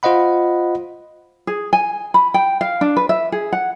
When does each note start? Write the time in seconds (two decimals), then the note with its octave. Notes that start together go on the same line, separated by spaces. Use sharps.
0.03 F4 C5 D#5 F#5 B5
1.47 G#4
1.73 G#5
2.14 B5
2.34 G5
2.61 F5
2.81 D4
2.97 B4
3.09 E5
3.32 G#4
3.53 F#5